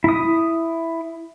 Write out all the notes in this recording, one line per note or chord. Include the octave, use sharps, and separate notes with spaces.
E4 D#6